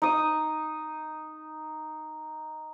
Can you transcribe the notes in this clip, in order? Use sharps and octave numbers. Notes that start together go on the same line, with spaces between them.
D#4 D#6